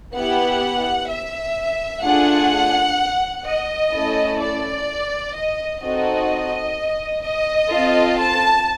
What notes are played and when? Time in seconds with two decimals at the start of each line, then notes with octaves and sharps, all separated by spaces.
0.16 B3 E4 G4 F#5
1.10 E5
2.04 A3 D4 F4 G#4 F#5
3.46 D#5
3.93 A3 C#4 E4 A4
4.40 D5
5.35 D#5
5.82 C4 D#4 F#4 A4 D#5
7.24 D#5
7.71 C4 F4 A4
8.19 A5